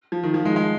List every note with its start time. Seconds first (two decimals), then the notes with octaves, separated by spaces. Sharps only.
0.12 F3
0.24 D#3
0.34 F3
0.45 G#3
0.56 G#3